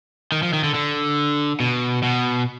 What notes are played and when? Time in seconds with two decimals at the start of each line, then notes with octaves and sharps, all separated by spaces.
0.32 D#3
0.43 F3
0.53 D#3
0.64 D3
0.74 D3
1.60 B2
2.03 B2